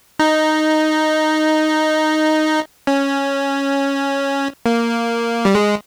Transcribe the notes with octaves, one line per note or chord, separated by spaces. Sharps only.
D#4
C#4
A#3
G3
G#3